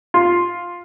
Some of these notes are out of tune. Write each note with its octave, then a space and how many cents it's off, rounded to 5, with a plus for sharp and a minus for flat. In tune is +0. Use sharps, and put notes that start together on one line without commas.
F4 +5